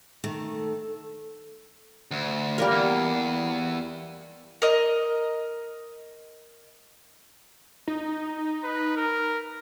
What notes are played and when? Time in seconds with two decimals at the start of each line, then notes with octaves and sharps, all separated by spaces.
0.24 D#3 A3
0.56 A4
2.11 D2
2.58 G3 A#3 A#4
2.71 E2
4.62 A#4 D#5
7.88 D#4
8.64 B4
8.96 A#4